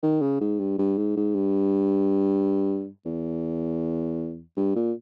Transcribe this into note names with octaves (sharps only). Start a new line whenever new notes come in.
D#3
C#3
G#2
G2
G2
G#2
G#2
G2
E2
G2
A#2